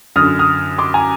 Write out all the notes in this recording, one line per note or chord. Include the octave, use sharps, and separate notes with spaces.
F#2 D3 D#6 F6
D#6 F6
C6 D6
G#5 A#5